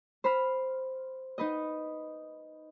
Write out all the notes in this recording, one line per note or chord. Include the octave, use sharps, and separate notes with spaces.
C5 B5 F6
D#4 B4 D#5